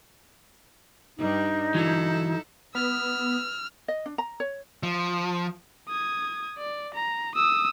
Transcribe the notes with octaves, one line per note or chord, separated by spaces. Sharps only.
G2 G3 D4 D#4
E3 F#3 E4 A4
B3 E6 F6
D#5
D4
A#5
C#5
F3
D#6 G#6
D5
A#5
D#6 E6